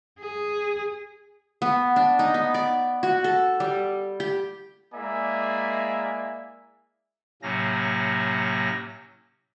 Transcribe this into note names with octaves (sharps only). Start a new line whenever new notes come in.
G#4
B3
D4
D#4
B3
D5
F#4
A4
G3
G4
G#3 A#3 E4 D5 E5 G#5
A2 C3 F#3 A#3 C#4 A#6